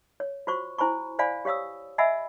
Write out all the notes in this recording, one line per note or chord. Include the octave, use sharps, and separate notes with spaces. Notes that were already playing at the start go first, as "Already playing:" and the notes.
C#5
F4 F#4 C5 C#6
E4 C5 G#5 B5 C#6
C5 D5 F5 G#5 B5
G4 C#5 F5 D#6 E6
D#5 E5 F#5 G#5 B5 E6